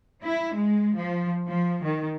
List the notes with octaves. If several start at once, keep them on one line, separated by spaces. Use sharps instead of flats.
E4
G#3
F3
F3
D#3